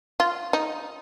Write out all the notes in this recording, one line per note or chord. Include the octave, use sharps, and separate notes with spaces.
F4
D#4